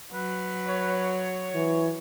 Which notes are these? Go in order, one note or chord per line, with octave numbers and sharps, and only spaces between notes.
F#3 B4
C#5
E3